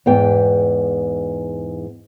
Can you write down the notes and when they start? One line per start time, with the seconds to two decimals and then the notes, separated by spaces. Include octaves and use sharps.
0.06 E2 G#2 B3 G5